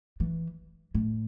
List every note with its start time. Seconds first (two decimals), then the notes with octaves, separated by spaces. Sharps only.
0.20 E3
0.95 A2